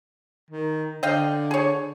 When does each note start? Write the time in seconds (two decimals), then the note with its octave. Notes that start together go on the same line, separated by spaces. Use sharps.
0.50 D#3
1.03 D3 D#5 F5 G5
1.51 G#4 C#5